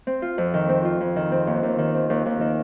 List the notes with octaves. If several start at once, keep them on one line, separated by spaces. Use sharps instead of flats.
C4
F4
F2
D#3
C4
F4
F2
D#3
C4
D#2
D#2
D#3
C4
D#2
D#2
D#3